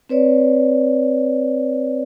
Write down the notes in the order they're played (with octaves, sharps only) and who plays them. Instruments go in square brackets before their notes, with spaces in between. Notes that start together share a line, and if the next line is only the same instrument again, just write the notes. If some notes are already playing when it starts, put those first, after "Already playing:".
[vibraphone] C4 B4 C#5 D5